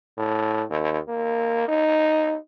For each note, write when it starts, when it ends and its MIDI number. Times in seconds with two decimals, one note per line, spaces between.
0.17 0.63 45
0.70 0.98 39
1.08 1.66 58
1.68 2.37 63